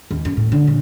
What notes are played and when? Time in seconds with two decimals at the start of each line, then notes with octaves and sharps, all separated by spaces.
0.11 D#2
0.25 F#2
0.37 A2
0.52 D3
0.67 A#2